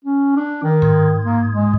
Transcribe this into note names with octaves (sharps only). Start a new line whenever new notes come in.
C#4
D4
D#3
G#2
A#3
G#3